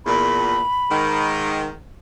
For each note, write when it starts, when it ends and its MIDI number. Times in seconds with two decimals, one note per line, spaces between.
0.06 0.62 40
0.06 0.62 46
0.06 1.28 83
0.90 1.74 44
0.90 1.74 51